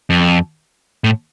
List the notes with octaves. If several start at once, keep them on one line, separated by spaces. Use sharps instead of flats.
F2
A2